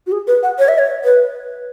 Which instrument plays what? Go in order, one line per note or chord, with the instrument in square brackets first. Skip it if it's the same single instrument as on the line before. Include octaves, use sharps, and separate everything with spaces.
[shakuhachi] F#4
G#4
B4
F#5
C#5
E5
C#5
B4